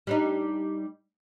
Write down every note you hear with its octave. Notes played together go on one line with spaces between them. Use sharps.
G3 D4 D#4